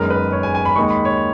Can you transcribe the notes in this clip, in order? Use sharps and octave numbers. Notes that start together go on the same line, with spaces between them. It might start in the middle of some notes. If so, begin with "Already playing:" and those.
Already playing: F#1 F#2 D#3 G#3 B3 A#4
B4
C#5
G#5
G#5
B5
D#2 D#3 G#3 D#4 C#6
B5
C#5